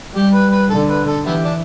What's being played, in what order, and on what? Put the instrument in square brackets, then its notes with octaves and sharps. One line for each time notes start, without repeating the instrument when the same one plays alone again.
[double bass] G3 [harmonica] G4
[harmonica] B4
B4
[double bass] D3 [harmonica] A4
[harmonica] B4
A4
[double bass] E3 [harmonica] B3 E4 G4
[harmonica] D4